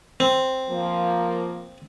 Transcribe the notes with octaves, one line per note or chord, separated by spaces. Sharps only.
C4
F3 A#3